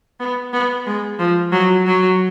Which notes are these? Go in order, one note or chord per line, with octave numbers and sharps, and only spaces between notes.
B3
B3
G#3
F3
F#3
F#3